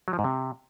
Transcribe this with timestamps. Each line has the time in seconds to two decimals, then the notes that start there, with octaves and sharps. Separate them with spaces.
0.08 F#3
0.13 F3
0.19 G#2
0.24 C3